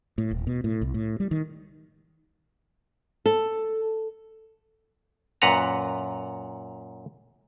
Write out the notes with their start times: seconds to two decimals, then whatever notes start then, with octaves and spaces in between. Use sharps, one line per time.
0.18 A2
0.31 D#1
0.47 B2
0.64 A2
0.81 C2
0.94 A2
1.20 G3
1.31 D#3
3.26 A4
5.42 F#2 A#2 B4 F#5 A#5